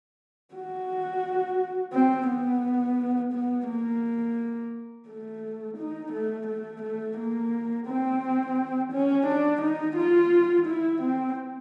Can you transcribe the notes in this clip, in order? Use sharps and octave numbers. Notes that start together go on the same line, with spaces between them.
F#4
C4
B3
B3
A#3
A3
D#4
A3
A3
A3
A#3
C4
C#4
D4
D#4
F4
E4
C4